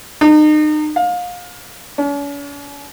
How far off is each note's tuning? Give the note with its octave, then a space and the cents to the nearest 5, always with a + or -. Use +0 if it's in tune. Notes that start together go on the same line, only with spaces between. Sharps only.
D#4 -35
F5 +30
C#4 +45